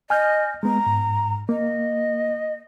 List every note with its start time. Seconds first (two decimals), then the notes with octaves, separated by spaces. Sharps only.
0.10 D#5 G#5 F6 G6
0.63 G#3 B3 A#5
0.86 G#2
1.49 A#3 D#5